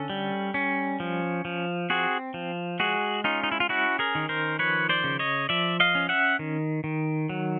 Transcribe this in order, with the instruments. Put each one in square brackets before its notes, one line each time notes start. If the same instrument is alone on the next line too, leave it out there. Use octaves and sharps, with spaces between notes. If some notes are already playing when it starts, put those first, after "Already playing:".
Already playing: [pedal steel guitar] D3 C#4 A4
G3
C#4
F3
F3
C4 F#4 G#4
F3
G#3 F#4 G#4
C#4 D#4 F4
D#4
E4
F4
C#4 E4 F#4
G#4 A#4
D#3
A#4 C5
F3 B4 C#5
C5 D5
C#3
C#5 D#5
F3 D5 E5
D#5 F5
C#4
E5 F#5
D#3
D#3
F#3